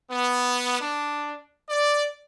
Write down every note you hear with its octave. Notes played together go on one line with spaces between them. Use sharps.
B3
D4
D5